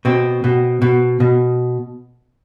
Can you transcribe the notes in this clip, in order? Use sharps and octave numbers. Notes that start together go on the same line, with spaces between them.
B2 C4
B2
B2
B2